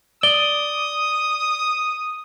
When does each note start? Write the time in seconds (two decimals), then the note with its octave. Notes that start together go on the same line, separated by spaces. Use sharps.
0.23 D5 D#6 G7